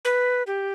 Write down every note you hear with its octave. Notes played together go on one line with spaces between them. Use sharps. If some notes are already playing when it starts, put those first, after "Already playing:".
B4
G4